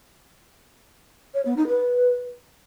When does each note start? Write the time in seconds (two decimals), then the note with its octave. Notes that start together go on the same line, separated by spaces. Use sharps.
1.34 C#5
1.45 B3
1.57 D#4
1.68 B4